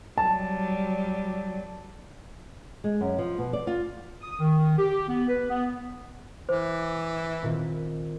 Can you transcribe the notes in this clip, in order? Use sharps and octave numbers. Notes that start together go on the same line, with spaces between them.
F#3 G3 A5
G#3
F#2
F3
B2
D5
F4
D#6
D#3
G4
B3
B4
B3
E3 C5 D6
A#2 D#3 C4